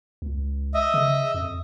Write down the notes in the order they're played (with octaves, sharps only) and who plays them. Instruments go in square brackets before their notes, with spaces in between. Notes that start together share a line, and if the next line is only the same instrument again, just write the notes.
[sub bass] C#2
[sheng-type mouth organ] D#5 E5
[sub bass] C#3
F2